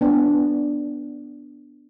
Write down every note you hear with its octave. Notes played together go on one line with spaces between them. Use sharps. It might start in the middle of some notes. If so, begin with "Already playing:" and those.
B3 D4